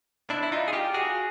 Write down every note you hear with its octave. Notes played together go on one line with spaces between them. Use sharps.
D4 E4
E4
D#4 F4
G#4
F4 G4
F#4 G#4